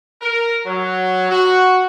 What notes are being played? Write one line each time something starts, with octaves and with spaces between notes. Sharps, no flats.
A#4
F#3
F#4